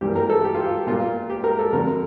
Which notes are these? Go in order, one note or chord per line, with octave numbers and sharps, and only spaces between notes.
G2 E3 G3 A#3 G4
A#4
A4
G4
F4
G4
A#2 G3 A#3 F4
G4
A#4
A4
F2 D3 A3 A#4